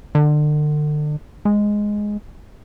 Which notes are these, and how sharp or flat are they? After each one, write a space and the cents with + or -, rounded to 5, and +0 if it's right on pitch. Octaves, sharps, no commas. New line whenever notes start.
D3 +35
G#3 +0